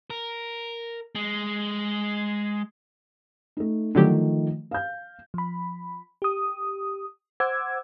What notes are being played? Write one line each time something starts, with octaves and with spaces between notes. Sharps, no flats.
A#4
G#3
A3 D#4
D3 D#3 F3 F#3 A3 G4
F5 G6
F3 B5
G4 D#6
C5 F#5 D6 E6 G#6